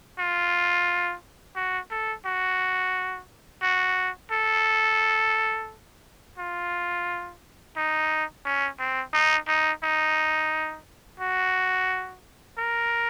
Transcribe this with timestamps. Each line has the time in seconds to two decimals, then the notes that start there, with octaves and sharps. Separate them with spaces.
0.19 F4
1.56 F#4
1.90 A4
2.25 F#4
3.62 F#4
4.31 A4
6.38 F4
7.76 D#4
8.45 C#4
8.79 C4
9.13 D#4
9.48 D#4
9.83 D#4
11.20 F#4
12.58 A#4